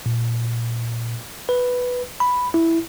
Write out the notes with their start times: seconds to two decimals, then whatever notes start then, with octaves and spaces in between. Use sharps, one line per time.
0.06 A#2
1.49 B4
2.20 B5
2.54 E4